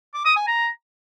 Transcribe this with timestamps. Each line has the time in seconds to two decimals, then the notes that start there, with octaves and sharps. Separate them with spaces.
0.14 D6
0.25 D#6
0.36 G#5
0.47 A#5